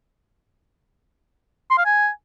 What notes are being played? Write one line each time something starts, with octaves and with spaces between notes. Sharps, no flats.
C6
F5
G#5